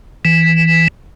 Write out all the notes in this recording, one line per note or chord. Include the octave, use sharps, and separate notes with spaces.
E3